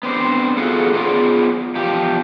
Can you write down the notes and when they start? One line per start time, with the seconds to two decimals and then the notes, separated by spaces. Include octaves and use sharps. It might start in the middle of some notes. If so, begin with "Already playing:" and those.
0.03 B3 C4 D4 C5
0.57 B3 D#4 F4 F#4 G#4 A4
0.94 B3 F4 G#4 C5 D5
1.75 E2 F3 G4